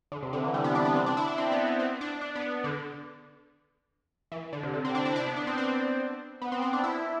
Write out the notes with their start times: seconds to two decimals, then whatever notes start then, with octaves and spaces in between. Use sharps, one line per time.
0.12 D3
0.23 C3
0.33 D3
0.44 E3
0.54 G3
0.64 B3
0.75 D4
0.85 B3
0.96 C4
1.06 D4
1.17 E4
1.27 D4
1.38 C4
1.52 B3
1.66 B3
1.80 C4
2.01 D4
2.21 D4
2.35 B3
2.64 D3
4.32 E3
4.53 D3
4.63 C3
4.73 D3
4.85 C4
4.95 D4
5.05 E4
5.16 D4
5.27 B3
5.36 D4
5.47 C4
5.58 C4
6.42 B3
6.52 C4
6.62 C4
6.73 D4
6.84 E4